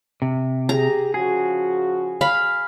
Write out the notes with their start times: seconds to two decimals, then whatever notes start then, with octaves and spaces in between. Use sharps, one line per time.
0.22 C3
0.69 G4 G#4 A#5
1.14 C#3 F3 F#4 G#4
2.21 F5 B5